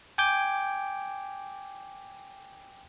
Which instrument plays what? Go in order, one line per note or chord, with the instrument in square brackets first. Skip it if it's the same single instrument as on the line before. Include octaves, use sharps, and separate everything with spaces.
[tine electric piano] G5 G#5 D6 G6